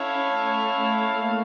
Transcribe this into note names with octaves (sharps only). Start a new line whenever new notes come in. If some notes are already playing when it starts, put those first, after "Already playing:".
Already playing: C#4 E4 A4 C#5 F5
A3
A3
A#3